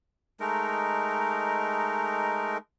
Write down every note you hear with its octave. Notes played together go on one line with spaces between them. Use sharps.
G#3 A3 D#4 A#4